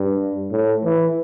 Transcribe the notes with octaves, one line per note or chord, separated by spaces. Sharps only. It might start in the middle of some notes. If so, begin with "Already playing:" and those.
Already playing: G2
A2
E3